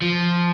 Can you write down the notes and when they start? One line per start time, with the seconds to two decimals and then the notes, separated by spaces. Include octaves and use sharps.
0.02 F3